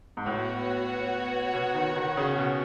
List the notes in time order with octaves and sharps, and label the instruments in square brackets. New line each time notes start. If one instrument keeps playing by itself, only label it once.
[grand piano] G#2
[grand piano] A2 [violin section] B3 F#4 C#5
[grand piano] B2
D#3
D#3
C#3
B2